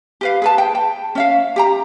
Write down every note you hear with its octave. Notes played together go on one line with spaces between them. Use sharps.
G4 B4 F5
G#4 B4 A5
G5
G5
C#4 E5 F5
G4 G5 A#5